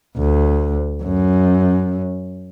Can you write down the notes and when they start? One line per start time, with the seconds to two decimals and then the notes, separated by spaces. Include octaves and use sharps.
0.17 D2
1.03 F#2